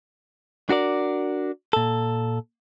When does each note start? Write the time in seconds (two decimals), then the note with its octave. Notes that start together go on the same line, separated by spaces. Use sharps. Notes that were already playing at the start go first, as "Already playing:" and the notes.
0.69 D4 F#4 A#4 D5
1.73 A#2 A4